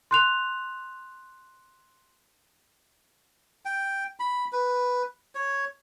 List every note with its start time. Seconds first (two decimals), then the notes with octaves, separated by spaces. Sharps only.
0.11 C6 F#6 F7
3.65 G5
4.20 B5
4.52 B4
5.35 C#5